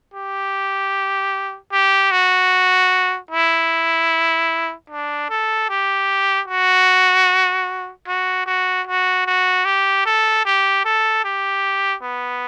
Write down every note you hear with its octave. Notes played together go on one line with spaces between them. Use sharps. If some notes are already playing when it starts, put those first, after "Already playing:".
G4
G4
F#4
E4
D4
A4
G4
F#4
F#4
F#4
F#4
F#4
G4
A4
G4
A4
G4
B3